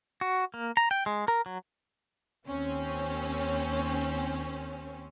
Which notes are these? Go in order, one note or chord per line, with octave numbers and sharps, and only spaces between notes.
F#4
A#3
A#5
G5
G#3
A#4
F#3
D#2 C4 C#4